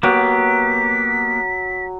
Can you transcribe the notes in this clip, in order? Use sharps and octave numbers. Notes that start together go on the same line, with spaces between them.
F#3 A#3 B3 G4 B6